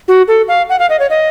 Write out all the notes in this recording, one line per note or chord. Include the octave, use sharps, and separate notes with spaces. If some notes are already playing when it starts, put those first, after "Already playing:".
F#4
A4
F5
F#5
F5
D#5
C#5
D#5